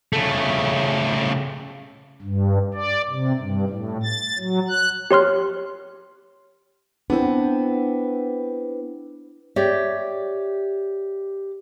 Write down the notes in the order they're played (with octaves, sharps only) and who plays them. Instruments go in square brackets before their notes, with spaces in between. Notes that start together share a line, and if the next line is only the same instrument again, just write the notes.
[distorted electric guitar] C#3 A3
[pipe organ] G2
D5
C3
G2
A2
A6
F#3
F#6
[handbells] G4 C#5 C6 F6
[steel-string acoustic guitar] B3 C4 [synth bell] D4 E4
[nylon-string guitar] G4 C#5 D5 E5